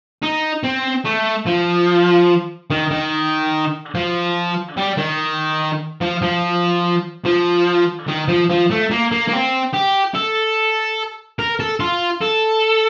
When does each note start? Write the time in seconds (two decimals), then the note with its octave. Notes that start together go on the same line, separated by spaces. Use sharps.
0.23 D#4
0.64 C4
1.05 A3
1.47 F3
2.70 D#3
2.91 D#3
3.95 F3
4.77 G3
4.98 D#3
6.01 F3
6.22 F3
7.25 F3
8.08 D#3
8.28 F3
8.50 F3
8.70 A3
8.91 A#3
9.11 A#3
9.28 A#3
9.32 C4
9.73 G4
10.15 A4
11.39 A#4
11.60 A4
11.80 F4
12.21 A4